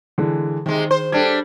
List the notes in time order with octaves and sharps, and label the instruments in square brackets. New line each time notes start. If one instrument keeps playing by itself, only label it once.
[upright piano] D3 E3 G#3
[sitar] C3 G#3 [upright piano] D#3
[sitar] C5
[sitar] G3 D4 [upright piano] A4 G#6